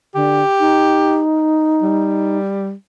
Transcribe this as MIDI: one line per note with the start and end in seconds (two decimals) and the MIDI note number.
0.15 0.42 50
0.15 1.21 67
0.60 2.38 63
1.82 2.73 55